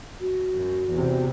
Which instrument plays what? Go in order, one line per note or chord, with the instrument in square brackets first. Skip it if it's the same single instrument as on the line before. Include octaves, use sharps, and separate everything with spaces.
[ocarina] F#4
[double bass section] F#2
E2 C3